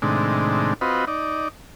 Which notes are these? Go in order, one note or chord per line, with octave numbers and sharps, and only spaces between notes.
A2 C3 D#3 G#3 D4
C4 F4 F#4 B4 D#5
D#4 D5